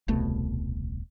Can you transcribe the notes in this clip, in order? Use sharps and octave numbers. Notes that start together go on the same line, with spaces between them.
D#1 C2 B2 A3